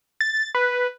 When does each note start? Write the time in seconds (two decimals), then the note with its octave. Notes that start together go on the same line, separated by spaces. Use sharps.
0.21 A6
0.55 B4